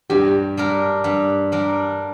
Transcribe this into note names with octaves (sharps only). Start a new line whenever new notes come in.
G2 G4
G3 D4 A#4
G2
G3 D4 A#4